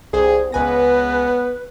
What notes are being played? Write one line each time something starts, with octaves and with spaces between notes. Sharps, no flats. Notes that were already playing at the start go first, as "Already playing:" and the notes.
C2 G#4 C5
C#2 B3 B4 G#5 A#6